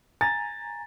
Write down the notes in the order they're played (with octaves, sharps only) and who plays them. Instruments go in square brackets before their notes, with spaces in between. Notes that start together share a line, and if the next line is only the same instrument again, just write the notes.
[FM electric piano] G#5 A#5 [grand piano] A6